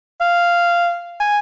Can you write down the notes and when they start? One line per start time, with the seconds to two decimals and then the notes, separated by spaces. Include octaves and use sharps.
0.21 F5
1.20 G#5